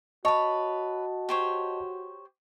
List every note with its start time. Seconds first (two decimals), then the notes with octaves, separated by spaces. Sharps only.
0.25 F#4 B4 C#5 D#5 A5
1.29 G4 C5 C#5